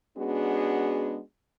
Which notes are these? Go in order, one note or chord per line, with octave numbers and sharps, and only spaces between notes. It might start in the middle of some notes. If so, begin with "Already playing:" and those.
G#3 B3 C#4 D4 F#4 G#4